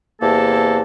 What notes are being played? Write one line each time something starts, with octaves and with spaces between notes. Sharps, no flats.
E2 C3 A#3 E4 A4 A5